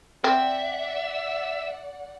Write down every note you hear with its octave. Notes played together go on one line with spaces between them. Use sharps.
C4 D5 E5 F#5